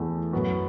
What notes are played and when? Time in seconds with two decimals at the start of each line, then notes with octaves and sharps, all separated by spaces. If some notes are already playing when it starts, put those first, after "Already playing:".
Already playing: E2 E3 A3
0.33 F#2 F#3 B3 F#4